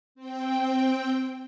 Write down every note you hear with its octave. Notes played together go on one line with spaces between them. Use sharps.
C4 G5